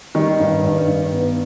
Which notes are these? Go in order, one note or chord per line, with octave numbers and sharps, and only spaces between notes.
D#3 G3
G2
G2
G2
B3